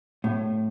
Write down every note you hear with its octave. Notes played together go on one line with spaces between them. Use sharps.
A2